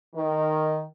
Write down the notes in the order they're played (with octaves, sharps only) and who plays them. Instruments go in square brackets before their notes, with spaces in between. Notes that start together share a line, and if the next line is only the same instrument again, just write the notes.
[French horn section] D#3